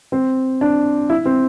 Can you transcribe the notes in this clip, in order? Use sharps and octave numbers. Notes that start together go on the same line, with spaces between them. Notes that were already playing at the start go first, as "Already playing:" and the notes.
C4
D4
E4
C4